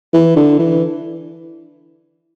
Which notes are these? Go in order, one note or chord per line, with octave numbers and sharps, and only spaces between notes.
E3
D3
E3